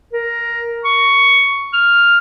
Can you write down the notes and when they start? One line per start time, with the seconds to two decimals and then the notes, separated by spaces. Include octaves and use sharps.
0.13 A#4
0.85 C#6
1.73 F6